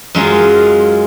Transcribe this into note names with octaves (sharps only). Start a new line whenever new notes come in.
F#2 G#3 F4